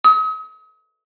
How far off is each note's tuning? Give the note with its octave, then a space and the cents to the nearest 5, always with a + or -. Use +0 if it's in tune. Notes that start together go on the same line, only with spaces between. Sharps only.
D#6 +40